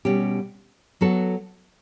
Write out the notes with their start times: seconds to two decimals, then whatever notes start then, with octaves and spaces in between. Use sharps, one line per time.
0.05 B2 G3 C#4 G4
1.01 F#3 B3 F#4 A4